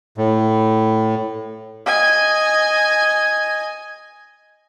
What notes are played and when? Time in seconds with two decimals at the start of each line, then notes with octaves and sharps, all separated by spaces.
0.18 A2
1.86 D#5 G#5